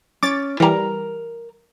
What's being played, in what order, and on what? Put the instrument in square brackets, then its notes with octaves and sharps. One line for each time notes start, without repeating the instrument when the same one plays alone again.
[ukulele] C#4 [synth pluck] D6 A6
[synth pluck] E3 G3 [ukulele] A#4 A#5